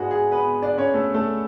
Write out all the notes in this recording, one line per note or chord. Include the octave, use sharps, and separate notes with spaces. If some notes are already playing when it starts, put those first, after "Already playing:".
Already playing: G#2 G#3 B3 D4 F#4 G#4
G#4
B3 B4
D4 D5
C#4 C#5
A3 A4
A3 A4